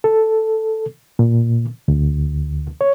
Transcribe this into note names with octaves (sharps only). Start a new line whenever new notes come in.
A4
A#2
D2
C#5